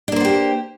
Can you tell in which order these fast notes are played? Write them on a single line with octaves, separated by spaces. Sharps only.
D4 A#3 C5 B3 G4